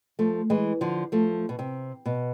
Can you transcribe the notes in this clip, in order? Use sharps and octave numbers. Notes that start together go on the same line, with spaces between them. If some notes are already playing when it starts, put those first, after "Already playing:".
F3 A3
E3 G#3
D3 F3
F3 A3
B2
C3
B2